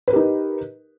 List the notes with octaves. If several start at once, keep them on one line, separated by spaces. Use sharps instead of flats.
D#4 G4 A#4 B4